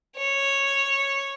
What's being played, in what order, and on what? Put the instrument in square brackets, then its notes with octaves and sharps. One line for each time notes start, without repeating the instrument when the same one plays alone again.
[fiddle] C#5